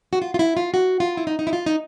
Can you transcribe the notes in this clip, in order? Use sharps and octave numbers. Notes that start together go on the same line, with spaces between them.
F#4
F4
F4
E4
F4
F#4
F4
E4
D#4
D#4
E4
F4
D#4